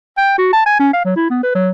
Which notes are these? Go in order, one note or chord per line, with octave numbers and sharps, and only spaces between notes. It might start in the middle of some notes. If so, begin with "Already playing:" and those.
G5
F#4
A5
G#5
C#4
F5
F#3
E4
B3
B4
F#3